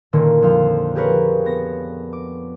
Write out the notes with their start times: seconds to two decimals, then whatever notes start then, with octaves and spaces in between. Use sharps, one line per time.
0.13 A#2 D3 D#3 A#3 C#4
0.42 F2 F3 F5
0.95 G4 G#4 A#4 B4 C#5
1.45 B3 A#6
2.13 D6